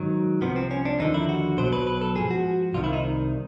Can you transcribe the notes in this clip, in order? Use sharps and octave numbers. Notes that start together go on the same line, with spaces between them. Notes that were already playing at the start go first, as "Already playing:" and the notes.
Already playing: G#2 D#3 F#3
C2 C3 F3 B3
C4
C#4
D4
D#2 D3 F3 D#4
E4
F#4
B1 B2 F#3 C5
B4
B4
A4
G#2 F3 G#4
F#4
C2 C3 D#3 F4
E4
D#4